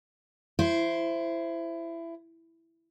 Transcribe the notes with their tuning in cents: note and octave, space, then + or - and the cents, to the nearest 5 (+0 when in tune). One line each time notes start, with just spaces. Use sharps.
E4 +20 C5 -5